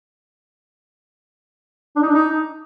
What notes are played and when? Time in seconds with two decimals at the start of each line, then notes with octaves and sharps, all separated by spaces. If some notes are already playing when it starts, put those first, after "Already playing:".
1.96 D4
2.02 D#4
2.09 D4
2.15 D#4